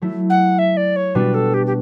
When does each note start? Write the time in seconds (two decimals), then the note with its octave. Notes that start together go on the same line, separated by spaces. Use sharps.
0.02 F#3 A3 E4
0.30 F#5
0.59 E5
0.77 D5
0.96 C#5
1.15 B2 G3 D4 F#4 B4
1.34 A4
1.54 G4
1.66 G4